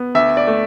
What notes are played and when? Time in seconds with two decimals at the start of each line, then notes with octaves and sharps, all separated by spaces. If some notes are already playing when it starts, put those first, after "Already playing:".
Already playing: B3
0.15 D2 E5
0.37 D5
0.47 A3